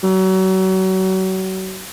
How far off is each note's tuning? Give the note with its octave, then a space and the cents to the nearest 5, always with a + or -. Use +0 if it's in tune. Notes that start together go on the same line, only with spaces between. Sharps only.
F#3 +30